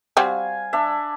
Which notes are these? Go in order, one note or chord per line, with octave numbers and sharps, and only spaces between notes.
G3 C4 F#4 F5 G#5
D4 E5